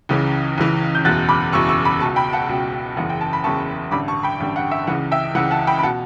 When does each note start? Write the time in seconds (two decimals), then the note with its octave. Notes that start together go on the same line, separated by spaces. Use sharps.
0.09 C#2 C#3 E3
0.58 C#2 C#3 E3
0.95 G6
1.05 F#1 E2 B2 F#6 A6
1.29 B5 D6
1.52 F#1 E2 B2 C#6 E6
1.69 C#6 E6
1.85 B5 D6
2.00 B2 A5 C#6
2.05 C#2
2.16 G5 B5
2.33 F#5 A5
2.49 C#2 B2
2.97 F#1 E2 C#3 E3 F#5
3.10 G5
3.21 A5
3.33 B5
3.44 F#1 E2 C#3 E3 A5 C#6
3.91 A1 G2 D3 B5 D6
4.08 A5 C#6
4.23 G5 B5
4.40 A1 G2 D3
4.56 F#5
4.71 E5
4.87 C#2 C#3 E3 F#5
5.12 E5 G5
5.35 C#2 C#3 E3 F#5
5.51 F#5 A5
5.67 G5 B5
5.79 B5
5.83 B2 F#5 A5